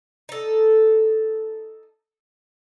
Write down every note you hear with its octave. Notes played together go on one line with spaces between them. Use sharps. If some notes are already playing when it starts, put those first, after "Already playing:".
D#4 A4